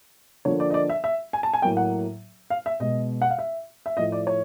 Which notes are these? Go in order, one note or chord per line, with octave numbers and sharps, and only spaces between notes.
D3 F3 A#3 C#5
D5
D#5
D5
E5
E5
G#5
A5
G#5
A2 F#3 A#3 G5
F#5
F5
E5
B2 G#3 D#5
F#5
F5
E5
E5
A2 F3 A3 D#5
D5
C#5